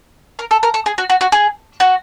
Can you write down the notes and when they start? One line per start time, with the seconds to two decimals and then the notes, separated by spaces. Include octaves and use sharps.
0.39 A#4
0.51 A4
0.63 A#4
0.74 A4
0.86 G#4
0.98 F#4
1.10 F#4
1.21 F#4
1.32 G#4
1.80 F#4